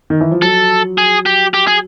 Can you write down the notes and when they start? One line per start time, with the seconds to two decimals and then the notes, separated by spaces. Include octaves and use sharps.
0.10 D#3
0.21 E3
0.31 F3
0.42 F#3 A4
0.98 G#4
1.26 G4
1.54 G4
1.67 G#4